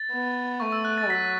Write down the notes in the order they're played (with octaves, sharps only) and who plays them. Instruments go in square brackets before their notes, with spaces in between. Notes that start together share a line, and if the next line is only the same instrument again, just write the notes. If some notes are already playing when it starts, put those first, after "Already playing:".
Already playing: [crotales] A6
[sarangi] B3
[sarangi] A3 [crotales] C#6
[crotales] E6
F#6
A6
[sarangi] F#3 [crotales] B6